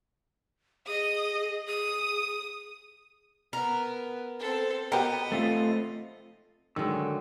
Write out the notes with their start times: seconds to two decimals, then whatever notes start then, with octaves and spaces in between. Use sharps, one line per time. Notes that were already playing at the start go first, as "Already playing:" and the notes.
0.87 G#4 D#5 D#6
1.67 G#4 D#6 D#7
3.53 B3 A#4
4.40 C4 A4
4.92 B3 F#4 G4 A#4 D#5
5.32 A3 C4 F4
6.76 D3 D#3 F#3 G#3 E6